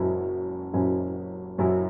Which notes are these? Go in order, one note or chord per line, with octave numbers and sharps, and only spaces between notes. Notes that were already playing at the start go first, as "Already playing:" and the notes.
Already playing: F#1 F#2 F#3 C#4 E4
F#1 F#2 F#3 C#4 E4
F#1 F#2 F#3 C#4 E4